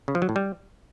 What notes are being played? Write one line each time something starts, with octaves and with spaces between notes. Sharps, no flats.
C#3
F3
F#3
A2
G3